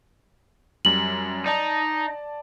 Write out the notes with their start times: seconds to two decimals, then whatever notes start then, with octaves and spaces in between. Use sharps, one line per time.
0.85 F#2 G3 F#7
1.46 D#4 D5 A5